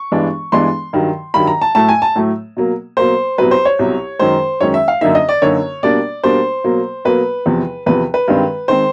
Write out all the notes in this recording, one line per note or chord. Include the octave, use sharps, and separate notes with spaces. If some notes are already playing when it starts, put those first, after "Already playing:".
Already playing: C#6
G2 E3 G#3 B3 D4
G2 E3 G#3 B3 D4 C6
G2 D#3 F#3
G2 D#3 F#3 B5
A#5
A5
A2 F#3 A3 A5
G#5
A5
A2 F#3 A3
B2 F#3 A#3
B2 F#3 A#3 C5
C2 B2 F#3 B4
C5
C#5
C2 B2 F#3
F#2 D#3 G#3 C#4 C5
F#2 D#3 G#3 C#4 C#5
E5
F5
F#2 D3 F#3 A#3 D#4 E5
D#5
D5
F#2 D3 F#3 A#3 D#4 C#5
B2 G3 A#3 D4 D5
B2 G3 A#3 D4 C5
B2 F#3 A#3
B2 F#3 A#3 B4
E2 C3 F3
E2 C3 F3 B4
B4
G2 D#3 G#3 C4
D#3 G#3 C4 C5